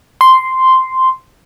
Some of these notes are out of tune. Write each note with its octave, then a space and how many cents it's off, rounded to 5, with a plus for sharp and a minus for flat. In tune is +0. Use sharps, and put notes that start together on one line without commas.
C6 -5